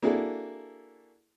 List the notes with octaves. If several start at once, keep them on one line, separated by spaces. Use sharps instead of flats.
A#3 D4 E4 F#4 G#4 A4